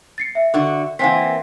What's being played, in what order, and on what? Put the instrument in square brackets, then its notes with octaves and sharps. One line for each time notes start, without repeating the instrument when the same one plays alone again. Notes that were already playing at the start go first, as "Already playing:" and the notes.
[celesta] A6 C7 C#7
E5
[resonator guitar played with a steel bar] D3 F#4
[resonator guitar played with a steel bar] E3 A#3 C4 [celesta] F#5 G#5 B6